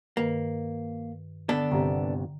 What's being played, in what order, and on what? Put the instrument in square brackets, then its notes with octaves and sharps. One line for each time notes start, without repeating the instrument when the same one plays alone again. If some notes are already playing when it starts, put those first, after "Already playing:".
[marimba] G2 D#3 B4 [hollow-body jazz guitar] A#3
[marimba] D3 [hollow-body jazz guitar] B3 D4 A4
[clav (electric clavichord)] G1 C3 [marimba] A#5